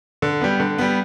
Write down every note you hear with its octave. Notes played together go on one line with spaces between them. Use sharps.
D3
G3 B3
D3
G3 B3